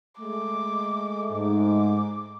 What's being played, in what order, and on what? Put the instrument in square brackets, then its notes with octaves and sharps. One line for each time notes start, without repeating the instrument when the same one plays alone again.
[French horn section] G#3 A3 [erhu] D6
[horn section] G#2 [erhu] D6